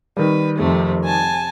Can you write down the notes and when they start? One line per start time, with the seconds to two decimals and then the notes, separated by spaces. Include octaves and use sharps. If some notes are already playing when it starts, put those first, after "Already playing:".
0.17 D#3 G3 B4
0.57 F2 C3 A3
1.04 G#5 A5